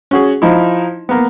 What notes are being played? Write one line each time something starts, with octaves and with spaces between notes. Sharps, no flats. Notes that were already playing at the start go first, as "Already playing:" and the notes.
C#4 F#4 G#4
F3 D#4 E4
A#3 B3